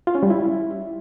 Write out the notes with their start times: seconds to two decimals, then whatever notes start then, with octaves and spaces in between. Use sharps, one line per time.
0.07 F4
0.15 C#4
0.23 G3
0.30 E4